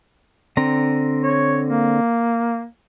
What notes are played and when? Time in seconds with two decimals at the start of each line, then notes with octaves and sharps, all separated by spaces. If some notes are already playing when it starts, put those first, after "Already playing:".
0.57 D3 C4 A#5
1.23 C#5
1.68 A#3